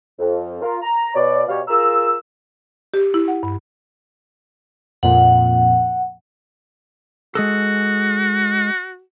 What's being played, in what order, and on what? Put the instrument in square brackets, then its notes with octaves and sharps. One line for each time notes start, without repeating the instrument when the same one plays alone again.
[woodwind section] F2
F4 A#4
A#5
B2 C#5 D5
B2 G3 C#5 F5
F4 G#4 A#4 A#5 E6
[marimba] G4
E4
F#5
G2
[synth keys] F2 A#2 [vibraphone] F#5
[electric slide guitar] G#3 G#4 A4 [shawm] F#4